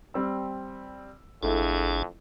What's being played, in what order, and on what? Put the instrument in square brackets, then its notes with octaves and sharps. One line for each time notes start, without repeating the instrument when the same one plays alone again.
[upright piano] G3 C4 E6
[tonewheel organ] G#1 D4 G#4 [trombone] F2 [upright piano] A3 E4 A4